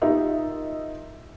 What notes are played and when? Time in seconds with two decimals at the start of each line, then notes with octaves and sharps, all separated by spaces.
0.02 D#4 F4 G4 A#4 D#5 E5